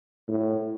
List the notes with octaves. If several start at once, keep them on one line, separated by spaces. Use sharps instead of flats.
A2